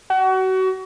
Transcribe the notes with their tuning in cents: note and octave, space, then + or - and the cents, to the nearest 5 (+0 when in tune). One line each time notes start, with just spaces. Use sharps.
F#4 +30